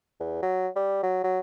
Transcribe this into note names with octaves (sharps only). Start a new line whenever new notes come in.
E2
F#3
G3
F#3
F#3